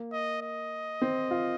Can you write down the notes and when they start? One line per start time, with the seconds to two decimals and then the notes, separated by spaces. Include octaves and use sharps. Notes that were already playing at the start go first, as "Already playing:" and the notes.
Already playing: A#3
0.12 D#5
0.42 D#5
1.02 C4
1.31 F4